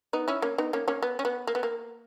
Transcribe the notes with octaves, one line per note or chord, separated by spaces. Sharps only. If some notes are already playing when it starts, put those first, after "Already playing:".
B3 D#4
C#4 E4
A#3 C#4
B3 D#4
A#3 C#4
A#3 C#4
B3
C#4
B3
A#3
B3
A#3